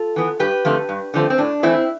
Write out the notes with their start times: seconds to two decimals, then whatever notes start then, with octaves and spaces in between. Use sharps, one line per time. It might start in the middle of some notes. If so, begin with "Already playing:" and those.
Already playing: F4 A4
0.16 E3 B3
0.39 G2 G4 B4
0.65 D3 F3 A3 C4
0.89 G2
1.14 D3 F3 A3 C4
1.30 C4
1.38 A2 D4
1.63 E3 A3 C4 E4